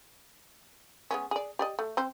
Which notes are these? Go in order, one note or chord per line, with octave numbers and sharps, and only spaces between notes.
G#3 B3 C#4
G#4 D5
G4 D5 D#5
A3
C4 C5